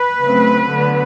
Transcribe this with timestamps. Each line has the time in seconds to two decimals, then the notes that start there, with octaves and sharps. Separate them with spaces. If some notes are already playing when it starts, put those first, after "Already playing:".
Already playing: B4
0.23 C#3 F#3 A3 C4
0.69 D3 F#3 B3